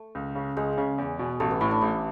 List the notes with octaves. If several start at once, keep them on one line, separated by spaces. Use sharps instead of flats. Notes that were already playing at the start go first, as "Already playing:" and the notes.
Already playing: A3
C#2
C#3
C#2 G#3
C#3
E2
B2
A1 A3
B3
A2 E4
D4
A1 E4